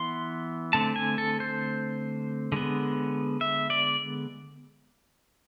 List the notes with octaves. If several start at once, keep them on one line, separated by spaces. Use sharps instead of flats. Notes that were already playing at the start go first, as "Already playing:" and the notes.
Already playing: E3 B3 C6
D3 A3 C4 A5
G#5
A4
C5
D3 G#3 B3
E5
D5